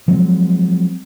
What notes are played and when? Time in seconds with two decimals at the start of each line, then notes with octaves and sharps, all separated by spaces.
0.08 F3 F#3 G#3 C4